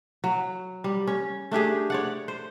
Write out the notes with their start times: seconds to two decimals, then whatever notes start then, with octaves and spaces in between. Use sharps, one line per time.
0.24 F#3
0.84 G3
1.07 C#4
1.51 A3 D4 G4 G#4
1.90 C#5 D5 F#5
2.28 C5